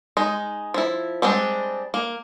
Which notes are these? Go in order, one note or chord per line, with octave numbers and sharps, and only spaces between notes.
G#3 D#4
F3 E4
G3 G#3 C4 D4
A#3